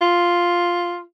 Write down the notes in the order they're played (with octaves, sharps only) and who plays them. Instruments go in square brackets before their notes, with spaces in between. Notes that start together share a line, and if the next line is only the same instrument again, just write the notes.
[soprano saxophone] F4